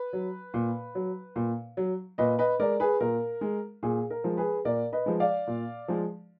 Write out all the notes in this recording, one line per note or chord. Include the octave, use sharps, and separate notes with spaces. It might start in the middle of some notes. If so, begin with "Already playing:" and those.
Already playing: B4
F#3
A#2
F#3
A#2
F#3
A#2 B4 D#5
B4 D#5
G#3 A#4 D5
G#4 B4
A#2 A#4
G#3
A#2 G#4
A#4
F3 G#3
G#4 B4
A#2 A#4 D5
B4 D#5
F3 G#3
D5 F5
A#2
F3 G#3